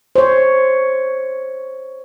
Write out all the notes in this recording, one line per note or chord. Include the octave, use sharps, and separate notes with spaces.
C5 C#5